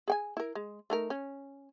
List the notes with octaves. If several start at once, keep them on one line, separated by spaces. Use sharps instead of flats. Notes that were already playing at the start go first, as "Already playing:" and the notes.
G#4 G5 G#5
E4 A#4
G#3
A3 D#4 A#4
C#4